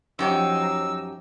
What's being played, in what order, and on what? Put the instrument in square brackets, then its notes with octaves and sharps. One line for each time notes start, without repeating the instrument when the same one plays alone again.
[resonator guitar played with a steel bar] F#2 G4 C#5 [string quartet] F3 D#4 [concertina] E6